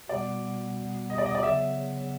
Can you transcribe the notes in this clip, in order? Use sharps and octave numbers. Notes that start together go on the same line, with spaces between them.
B2 G3 B3 D5
D#5
D5
D#5
D5
C#3 F#3 B3 E5